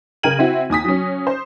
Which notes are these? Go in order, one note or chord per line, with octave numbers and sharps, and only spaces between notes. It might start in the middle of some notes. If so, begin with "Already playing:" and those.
C#3 A#4 G5 G#6 D#7 F#7
C4 E4 F#4
D#2 G#5 D#6 B6
F#3 C#4
C5